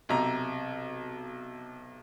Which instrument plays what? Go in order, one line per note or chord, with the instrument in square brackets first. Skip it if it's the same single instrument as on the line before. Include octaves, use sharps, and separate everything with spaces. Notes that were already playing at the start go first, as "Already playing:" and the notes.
[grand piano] B1 C3 A#5